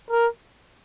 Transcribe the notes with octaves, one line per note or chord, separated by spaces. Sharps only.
A#4